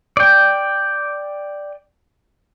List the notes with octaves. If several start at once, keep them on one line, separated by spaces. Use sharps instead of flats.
D5 G5